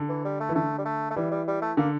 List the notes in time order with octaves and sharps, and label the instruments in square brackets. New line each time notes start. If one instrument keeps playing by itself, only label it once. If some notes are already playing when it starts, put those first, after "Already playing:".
Already playing: [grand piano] D3
[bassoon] E3
G3
A3
[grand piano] E3
[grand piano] D3 [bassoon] A3
[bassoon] G3
A3
A3
[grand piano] E3 [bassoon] G3
[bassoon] G3
G3
A3
[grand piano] D3 [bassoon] A#3